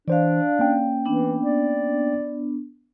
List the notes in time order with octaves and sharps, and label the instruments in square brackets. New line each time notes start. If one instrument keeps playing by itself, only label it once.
[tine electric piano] E3 C5 [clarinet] D4 [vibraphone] D5 F5
[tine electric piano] A#3 C#4 G5
[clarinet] E3 [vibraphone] B3 D4
[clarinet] D5